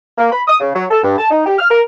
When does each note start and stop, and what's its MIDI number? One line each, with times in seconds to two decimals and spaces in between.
0.18 0.29 58
0.32 0.41 83
0.48 0.55 87
0.60 0.71 49
0.75 0.85 54
0.91 1.00 69
1.04 1.15 43
1.18 1.30 81
1.31 1.46 63
1.46 1.58 67
1.59 1.67 89
1.71 1.81 70